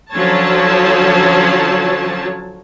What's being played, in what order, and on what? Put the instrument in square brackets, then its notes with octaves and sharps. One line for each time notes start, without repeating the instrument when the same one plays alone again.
[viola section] D3 F3 F#3 C#4 C#5 A5